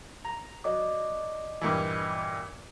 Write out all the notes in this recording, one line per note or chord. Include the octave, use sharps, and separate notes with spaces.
A#5
F#3 D5 D#5 D6
G2 A#2 E3